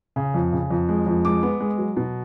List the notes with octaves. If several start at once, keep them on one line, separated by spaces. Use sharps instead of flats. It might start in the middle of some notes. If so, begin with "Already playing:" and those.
C#3
F2
C#3
F2
G#3
F2
G#3 D6
B3
G#3
F#3
B2